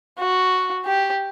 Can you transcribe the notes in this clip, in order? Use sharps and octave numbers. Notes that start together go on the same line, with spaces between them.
F#4
G4